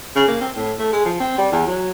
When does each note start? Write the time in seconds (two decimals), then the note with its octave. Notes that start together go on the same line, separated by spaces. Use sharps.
0.16 C#3
0.28 A#3
0.41 C4
0.56 A2
0.79 A3
0.92 G#3
1.05 F3
1.20 C4
1.38 G3
1.52 E2
1.66 F#3